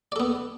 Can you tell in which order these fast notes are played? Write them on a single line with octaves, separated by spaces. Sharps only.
D5 A4 B3